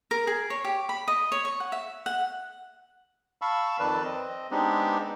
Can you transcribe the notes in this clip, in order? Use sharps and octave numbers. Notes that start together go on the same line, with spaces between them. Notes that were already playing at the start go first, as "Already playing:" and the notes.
A#4
G#4
C#5
G4
B5
D#5
C#5
C#6
F#5
E5
F#5
F5 A5 B5 C#6 E6
F2 D#3 B4 D5 A5
C4 D#5
G#3 B3 C4 D4 D#4 G4